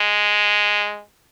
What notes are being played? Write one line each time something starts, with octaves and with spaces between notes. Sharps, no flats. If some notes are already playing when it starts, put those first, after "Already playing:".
Already playing: G#3